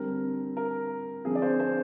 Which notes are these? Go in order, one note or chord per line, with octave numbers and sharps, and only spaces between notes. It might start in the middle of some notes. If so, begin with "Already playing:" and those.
Already playing: D3 G3 C4 A#4
A#4
D3 F3 C4 G#4
D5
C5
C5